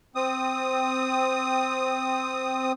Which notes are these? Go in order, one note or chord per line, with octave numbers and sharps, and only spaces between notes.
C4 D#6